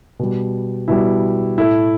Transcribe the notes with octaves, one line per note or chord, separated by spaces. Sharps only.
B2 G3
B2 G3 E4
A2 A3 E4